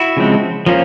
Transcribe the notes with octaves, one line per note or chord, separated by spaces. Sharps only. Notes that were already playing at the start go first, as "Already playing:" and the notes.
Already playing: E4 F#4
C#3 F3 G#3 C4
F3 A#3 C#4